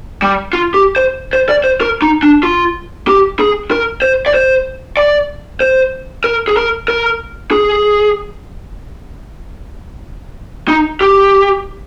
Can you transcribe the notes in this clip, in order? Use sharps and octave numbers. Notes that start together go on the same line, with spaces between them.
G3
F4
G4
C5
C5
D5
C5
A#4
D#4
D4
F4
G4
G#4
A#4
C5
D5
C5
D5
C5
A#4
G#4
A#4
A#4
G#4
D#4
G4